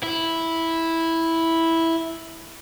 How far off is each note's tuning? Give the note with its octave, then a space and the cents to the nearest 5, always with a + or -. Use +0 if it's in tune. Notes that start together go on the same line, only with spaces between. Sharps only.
E4 -5